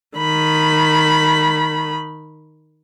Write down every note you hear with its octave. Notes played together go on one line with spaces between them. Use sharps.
D#3 B5